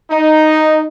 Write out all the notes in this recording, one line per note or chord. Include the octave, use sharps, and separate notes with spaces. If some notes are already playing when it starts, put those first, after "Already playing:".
D#4